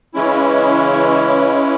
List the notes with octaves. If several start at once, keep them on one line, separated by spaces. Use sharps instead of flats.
C#3 E3 G#3 C#4 E4